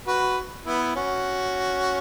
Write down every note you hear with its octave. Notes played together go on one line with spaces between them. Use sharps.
F#4 B4
B3 E4
C#4 F#4